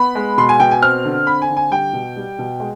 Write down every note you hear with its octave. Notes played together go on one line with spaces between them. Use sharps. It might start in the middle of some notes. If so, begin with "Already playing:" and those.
Already playing: B3 B5
G#3
B2 C6
G#5
B2 G5
G#5
C4 F6
D3
C4 B5
G#5
D3
G#5
G3 G5
B2
G3
B2
G#3